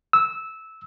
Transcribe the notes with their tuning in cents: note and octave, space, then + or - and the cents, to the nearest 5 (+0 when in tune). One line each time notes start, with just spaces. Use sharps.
E6 -15